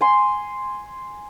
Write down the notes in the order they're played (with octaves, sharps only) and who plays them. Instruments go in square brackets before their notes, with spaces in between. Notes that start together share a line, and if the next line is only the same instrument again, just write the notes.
[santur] G#5 C6